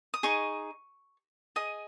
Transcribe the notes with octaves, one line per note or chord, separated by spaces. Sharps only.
D#6
D#4 G#4 D#5 C#6
G#4 D#5 D#6